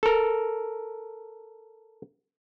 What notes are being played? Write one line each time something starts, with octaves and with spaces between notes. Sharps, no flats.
A4 A#4